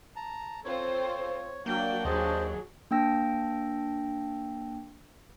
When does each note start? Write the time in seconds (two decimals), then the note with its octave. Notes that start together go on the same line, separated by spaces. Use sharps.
0.16 A5 A#5
0.65 C4 F4 A4 C5 C#5
1.66 F#3 A#3 D4 F#4 D5 G5
2.05 D#2 F#3 G#4 C5 D#5 A5
2.91 A#3 D4 G5 E6 A#6